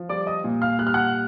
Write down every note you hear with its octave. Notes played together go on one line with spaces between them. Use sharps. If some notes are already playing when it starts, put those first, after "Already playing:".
Already playing: F3
G3 D5 D6
D#5 D#6
A#2
F5 F6
G3 F#6
F6
F#5 F#6